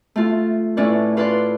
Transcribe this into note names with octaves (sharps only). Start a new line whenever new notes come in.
A3 F4
A2 A3 C#4 B4 D5 F#6
F4 B4 D5 C6 F#6